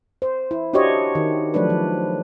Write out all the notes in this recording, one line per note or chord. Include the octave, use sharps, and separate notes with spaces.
C5
E4
D4 F#4 G4 C5 C#5 D#5
D#3
F3 F#3 A3 D4 B4
F3